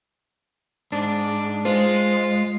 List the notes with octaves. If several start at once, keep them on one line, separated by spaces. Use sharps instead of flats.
G#2 D4
G#3 F4 C5